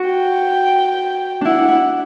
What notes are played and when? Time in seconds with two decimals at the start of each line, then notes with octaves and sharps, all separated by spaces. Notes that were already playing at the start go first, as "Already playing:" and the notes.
Already playing: F#4
0.10 G5
1.41 D4 E4 F#5
1.68 E4